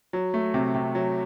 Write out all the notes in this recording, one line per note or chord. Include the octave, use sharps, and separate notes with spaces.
F#3
A3
C3
C3
F#3